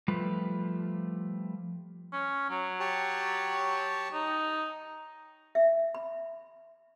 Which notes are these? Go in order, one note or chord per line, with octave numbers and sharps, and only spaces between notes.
F3 G3 A3 F4 B4
C#4
F#3
G4 C#5 A5
D#4
E5
B5